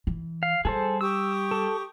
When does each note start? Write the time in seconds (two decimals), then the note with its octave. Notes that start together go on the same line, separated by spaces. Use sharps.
0.07 E3
0.43 F5
0.65 G3 G#4 A4 C5
1.01 G4 C#6 D#6 E6
1.51 A4